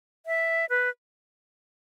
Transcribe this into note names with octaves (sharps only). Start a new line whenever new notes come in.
E5
B4